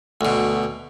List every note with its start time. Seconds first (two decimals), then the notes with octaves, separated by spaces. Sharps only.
0.21 D2 B2